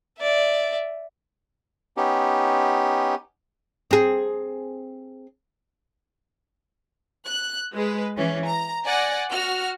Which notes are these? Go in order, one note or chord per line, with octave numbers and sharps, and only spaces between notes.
D5 E5
B3 C#4 D#4 G4
C4 G#4
F#6
G#3 B4
E3 C#4
A#5
D5 F#5 G#5 A#6
F#4 F6